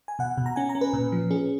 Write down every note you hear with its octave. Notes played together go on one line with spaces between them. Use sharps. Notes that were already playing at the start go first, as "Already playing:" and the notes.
G#5
B2 F#5
B2
A#5
C#4 G#5
A#5
C#4
B4
A#2
F3
C#4 G#4